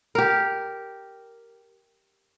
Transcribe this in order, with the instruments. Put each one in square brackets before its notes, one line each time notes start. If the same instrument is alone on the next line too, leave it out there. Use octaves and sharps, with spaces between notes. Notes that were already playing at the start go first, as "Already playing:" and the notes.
[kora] G4 A#4